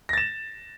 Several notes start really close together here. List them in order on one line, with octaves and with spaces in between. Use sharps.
A#6 A6 E7